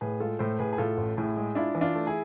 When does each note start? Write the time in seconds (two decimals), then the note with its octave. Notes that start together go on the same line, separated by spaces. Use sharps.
0.01 A2 G#4 B4
0.20 G#3 F4 A4
0.39 A2 A4 C5
0.59 A2 G#4 B4
0.73 G#4
0.78 A2 F4 A4
0.97 A1
1.17 A2 E4 G#4
1.37 G#3
1.55 D4 E4 F4
1.75 E3
1.81 D4 F4
1.95 A3
2.07 E4 G#4